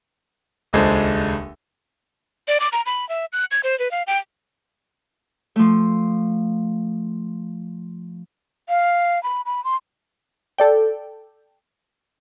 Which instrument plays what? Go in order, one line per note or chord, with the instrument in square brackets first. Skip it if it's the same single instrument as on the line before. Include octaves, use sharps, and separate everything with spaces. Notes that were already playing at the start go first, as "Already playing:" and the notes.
[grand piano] D#1 C#2 G#3 D4 A4 C5
[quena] D5
D6
A#5
B5
E5
F#6
G#6
C5
B4
F5
G5
[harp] F3 A3
[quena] F5
B5
B5
C6
[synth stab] A4 D5 G5